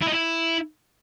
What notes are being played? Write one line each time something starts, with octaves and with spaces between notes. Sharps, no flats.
E4
D#4
E4